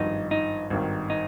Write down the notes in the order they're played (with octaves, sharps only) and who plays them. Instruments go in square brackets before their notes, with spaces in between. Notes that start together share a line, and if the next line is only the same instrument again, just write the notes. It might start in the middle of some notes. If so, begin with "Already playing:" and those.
Already playing: [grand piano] G#1 G2 F3 [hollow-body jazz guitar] D#4
[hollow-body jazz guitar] D#4
[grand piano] G#1 G2 D#3
[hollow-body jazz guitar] D#4